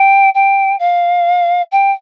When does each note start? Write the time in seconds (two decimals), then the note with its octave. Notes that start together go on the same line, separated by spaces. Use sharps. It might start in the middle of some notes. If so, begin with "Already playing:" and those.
Already playing: G5
0.35 G5
0.79 F5
1.72 G5